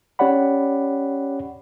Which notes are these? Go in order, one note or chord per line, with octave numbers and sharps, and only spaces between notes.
C#4 G4 C#5 D5 F#5 B5